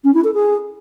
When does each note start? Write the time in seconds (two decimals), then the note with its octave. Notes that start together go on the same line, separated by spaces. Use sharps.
0.04 C#4
0.14 E4
0.24 A4
0.34 G#4